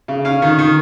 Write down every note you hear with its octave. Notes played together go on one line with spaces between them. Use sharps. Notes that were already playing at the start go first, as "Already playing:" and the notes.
C#3
C#4 F5
D#3
D#3